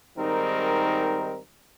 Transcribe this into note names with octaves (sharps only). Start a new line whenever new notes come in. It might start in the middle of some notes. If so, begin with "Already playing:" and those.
G#2 D#3 G3 C4 D#4 A#4